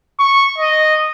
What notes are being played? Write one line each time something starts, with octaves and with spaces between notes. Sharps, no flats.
C#6
D#5